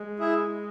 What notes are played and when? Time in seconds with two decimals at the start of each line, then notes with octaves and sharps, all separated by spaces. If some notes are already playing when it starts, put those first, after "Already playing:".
Already playing: G#3
0.20 E4 G#4 E5